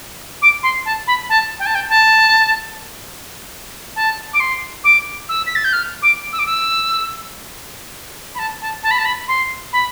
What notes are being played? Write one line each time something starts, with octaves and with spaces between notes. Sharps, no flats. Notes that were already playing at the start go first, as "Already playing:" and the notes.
D6
C6
A5
B5
A5
G5
A5
G5
A5
A5
D6
C6
D6
E6
B6
A6
G6
F6
D6
E6
D6
E6
B5
A5
A5
A5
B5
A5
B5
C6
B5